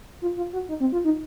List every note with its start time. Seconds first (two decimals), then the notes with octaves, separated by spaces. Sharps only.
0.22 F4
0.37 F4
0.53 F#4
0.69 D#4
0.80 C4
0.92 F4
1.05 D#4